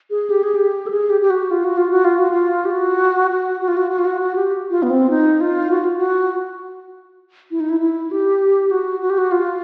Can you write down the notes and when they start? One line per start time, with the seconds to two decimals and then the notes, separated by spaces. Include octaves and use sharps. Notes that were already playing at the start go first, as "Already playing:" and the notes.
0.10 G#4
0.30 G4
0.43 G#4
0.55 G4
0.87 A4
0.90 G#4
1.10 G4
1.21 G4
1.30 F#4
1.51 F4
1.64 F#4
1.77 F4
1.91 F#4
2.05 F4
2.19 F#4
2.31 F4
2.65 G4
2.71 F#4
3.31 F#4
3.61 F#4
3.68 F4
3.77 F#4
3.91 F#4
3.99 F4
4.05 F#4
4.21 F#4
4.36 G4
4.70 F4
4.83 B3
4.90 C4
5.10 D#4
5.41 F4
5.71 F#4
5.84 F4
5.97 F#4
7.51 E4
7.60 D#4
7.69 E4
7.80 E4
8.11 G4
8.71 F#4
9.01 F#4
9.10 G4
9.18 F#4
9.32 F4